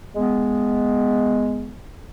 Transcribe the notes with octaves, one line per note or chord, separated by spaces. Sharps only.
G#3 B3